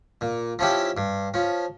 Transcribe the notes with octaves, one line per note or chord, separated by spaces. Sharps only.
A#2
F3 C#4 E4 G4
G2
F3 C#4